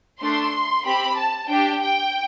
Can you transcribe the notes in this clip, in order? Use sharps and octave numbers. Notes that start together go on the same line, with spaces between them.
A3 D4 A4 C6
C4 G4 B5
A5
D4 G4 G5
G5